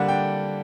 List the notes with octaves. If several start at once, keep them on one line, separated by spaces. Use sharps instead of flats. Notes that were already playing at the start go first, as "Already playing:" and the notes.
Already playing: D3 G3 A#3 D4 F#5
G5